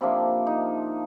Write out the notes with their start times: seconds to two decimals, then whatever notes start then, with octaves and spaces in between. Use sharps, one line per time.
0.01 C3 F3 A#3 D4 E4
0.47 D#4